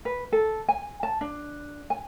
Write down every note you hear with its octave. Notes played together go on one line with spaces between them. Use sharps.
B4
A4
G#5
A5
D4
G#5